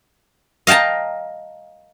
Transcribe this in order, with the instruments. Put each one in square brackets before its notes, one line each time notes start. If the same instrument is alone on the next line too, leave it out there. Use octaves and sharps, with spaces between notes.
[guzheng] D#5 F5 G5 A5 A#5